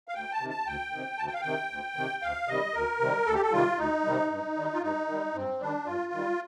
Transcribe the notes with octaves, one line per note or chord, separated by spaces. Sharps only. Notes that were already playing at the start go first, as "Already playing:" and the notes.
F5
D2 G5
A5
C3 D#3
A5
D2 G5
C3 D#3
D2 A5
G5
F5
C3 D#3 G5
D2
C3 D#3
D2 F5
C3 D#3 G3 D#5
D2 A#4
C3 D#3 G3
D2 A4
G4
A4
C3 D#3 G3 F4
D2 D#4
C3 D#3 G3
G2
D#3 G3
F4
G2 D#4
D#3 G3
G2 C4
D#3 G3 D4
G2 F4
D#3 G3